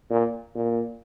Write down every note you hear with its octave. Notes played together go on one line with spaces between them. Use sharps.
A#2
A#2